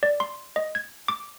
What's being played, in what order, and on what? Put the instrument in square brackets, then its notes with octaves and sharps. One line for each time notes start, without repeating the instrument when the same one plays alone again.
[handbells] D5
C6
D#5
G#6
D6